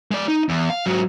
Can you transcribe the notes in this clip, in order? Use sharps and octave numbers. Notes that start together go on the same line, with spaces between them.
G#3 D5
D#4
E2
F5
G#2 F#3